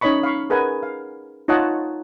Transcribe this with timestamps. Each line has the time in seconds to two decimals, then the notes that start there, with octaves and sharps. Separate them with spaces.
0.01 C#4 D#4 C#5 D#5 B5 C#6
0.23 F5 B5 C#6
0.50 G#4 A#4 B4 D#5 F#5 G#5
0.83 F5
1.48 D#4 F4 C#5 D#5 F#5 A5